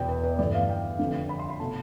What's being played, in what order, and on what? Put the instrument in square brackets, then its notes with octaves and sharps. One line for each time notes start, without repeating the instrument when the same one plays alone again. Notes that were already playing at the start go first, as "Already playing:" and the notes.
Already playing: [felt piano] E2 B2 B3 G5
B4
B4
G1 G2 E3 A3 D5
F5
G5
F2 D3 A3
B5
C6
B5
B2 A3 A5